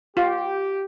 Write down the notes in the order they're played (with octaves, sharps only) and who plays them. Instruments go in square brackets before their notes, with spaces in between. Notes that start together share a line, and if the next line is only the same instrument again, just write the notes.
[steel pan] F4 [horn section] G4